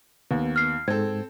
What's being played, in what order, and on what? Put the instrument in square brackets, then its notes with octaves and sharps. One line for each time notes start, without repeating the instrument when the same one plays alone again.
[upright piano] D#2 [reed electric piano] B3
[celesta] F6 C7
[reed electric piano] G#2 [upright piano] C4 A4 [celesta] G#6